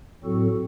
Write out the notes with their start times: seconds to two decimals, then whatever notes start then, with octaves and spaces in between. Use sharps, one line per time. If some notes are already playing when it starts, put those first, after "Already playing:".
0.23 A2 F#3 C4 F#4 A4